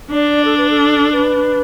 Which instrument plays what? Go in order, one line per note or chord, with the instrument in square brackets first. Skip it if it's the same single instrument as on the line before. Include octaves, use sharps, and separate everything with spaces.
[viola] D4 [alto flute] D5
[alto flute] A4
B4
A4
B4